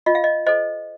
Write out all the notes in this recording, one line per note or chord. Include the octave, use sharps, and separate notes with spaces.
F4 D#5
F5
D#5
A4 C5 D#5